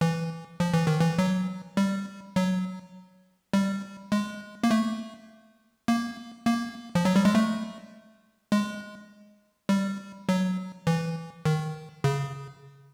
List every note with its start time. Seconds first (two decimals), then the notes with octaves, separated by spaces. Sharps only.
0.01 E3
0.60 F3
0.73 E3
0.87 D#3
1.01 E3
1.18 F#3
1.77 G3
2.36 F#3
3.53 G3
4.12 G#3
4.64 A#3
4.71 A3
5.88 A#3
6.46 A#3
6.95 F3
7.05 F#3
7.16 G3
7.25 G#3
7.35 A3
8.52 G#3
9.69 G3
10.29 F#3
10.87 E3
11.45 D#3
12.04 C#3